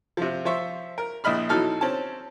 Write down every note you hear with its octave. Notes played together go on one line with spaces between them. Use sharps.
C3 F3
F3 C5 E5 C#6
A#4
A#1 E4 D#5 B5 F6
B2 E3 F#3 D#4 A4 F6
C4 C#4 A5